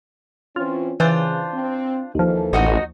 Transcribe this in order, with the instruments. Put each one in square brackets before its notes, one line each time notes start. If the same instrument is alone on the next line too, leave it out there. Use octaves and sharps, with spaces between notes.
[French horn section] E3 C4 C#4 [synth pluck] F4
[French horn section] C#3 [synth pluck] E3 [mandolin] D4 F4 C5
[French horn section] C4
[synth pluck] D#2 F3 [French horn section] E3 A#3 A4
[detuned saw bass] A1 [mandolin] D#4 F#4 D#5